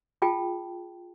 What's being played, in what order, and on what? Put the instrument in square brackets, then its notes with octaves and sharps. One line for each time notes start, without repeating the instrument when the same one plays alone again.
[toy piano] F4 G#4 G5 A5